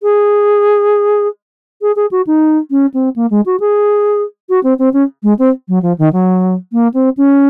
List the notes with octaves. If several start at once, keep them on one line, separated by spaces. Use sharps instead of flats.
G#4
G#4
G#4
F#4
D#4
C#4
C4
A#3
G#3
F#4
G#4
F#4
C4
C4
C#4
G#3
C4
F#3
F3
D#3
F#3
A#3
C4
C#4